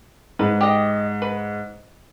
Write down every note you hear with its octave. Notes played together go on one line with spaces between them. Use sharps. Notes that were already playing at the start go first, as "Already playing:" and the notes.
G#2 B4
G4 D#5
B4